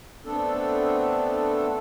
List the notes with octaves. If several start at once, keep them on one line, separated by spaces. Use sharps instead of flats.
A3 B3 C4 D4 A4